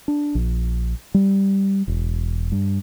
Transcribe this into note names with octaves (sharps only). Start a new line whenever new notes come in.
D4
A#1
G3
E1
G2